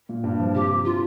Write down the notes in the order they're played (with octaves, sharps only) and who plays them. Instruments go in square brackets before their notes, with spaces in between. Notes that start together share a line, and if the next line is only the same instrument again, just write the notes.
[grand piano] A#2
G2
F3
[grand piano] C3 [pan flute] G4
[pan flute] F4